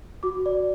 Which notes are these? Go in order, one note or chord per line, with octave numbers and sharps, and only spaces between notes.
F#4 D6
D5